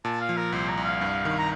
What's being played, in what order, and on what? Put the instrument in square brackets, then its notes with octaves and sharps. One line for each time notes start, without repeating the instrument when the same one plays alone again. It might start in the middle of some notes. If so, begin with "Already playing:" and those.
[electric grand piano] A#2 [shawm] A5
[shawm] F5
[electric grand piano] F3
[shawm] A#4
[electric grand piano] C2 [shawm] C5
[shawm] A#5
[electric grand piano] C2
[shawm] F5
[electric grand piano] G2
D#3
[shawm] A#5